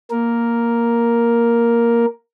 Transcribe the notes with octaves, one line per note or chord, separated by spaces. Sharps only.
A#3 A#4